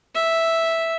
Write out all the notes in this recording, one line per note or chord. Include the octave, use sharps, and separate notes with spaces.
E5